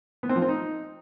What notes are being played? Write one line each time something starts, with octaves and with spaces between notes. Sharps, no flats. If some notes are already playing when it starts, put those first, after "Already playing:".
B3
C4
F3
C4
D#4